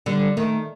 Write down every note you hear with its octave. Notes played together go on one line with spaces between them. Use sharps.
D3 G3
D#3 A3